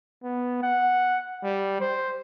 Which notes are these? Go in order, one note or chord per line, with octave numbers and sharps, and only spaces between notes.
B3
F#5
G3
C5